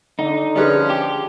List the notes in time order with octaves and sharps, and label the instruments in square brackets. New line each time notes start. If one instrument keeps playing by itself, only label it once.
[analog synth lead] D3 [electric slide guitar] D#4
[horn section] F3 C#4 [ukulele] G#4 B4 D5
[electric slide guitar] G4